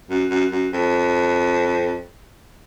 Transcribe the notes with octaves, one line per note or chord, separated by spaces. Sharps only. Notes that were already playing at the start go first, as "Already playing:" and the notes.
F#2
F#2
F#2
F2